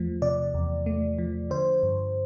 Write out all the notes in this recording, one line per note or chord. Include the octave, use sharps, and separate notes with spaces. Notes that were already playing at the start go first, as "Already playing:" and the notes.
Already playing: E2 F3 A3
C3 D5
E2
A3
F3
D3 C5
G2